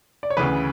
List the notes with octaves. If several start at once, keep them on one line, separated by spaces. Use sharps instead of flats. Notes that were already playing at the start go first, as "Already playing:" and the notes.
D5
C#5
D2 C#3 E3 B4